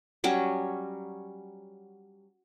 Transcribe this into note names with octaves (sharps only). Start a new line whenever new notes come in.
F#3 G3 C#4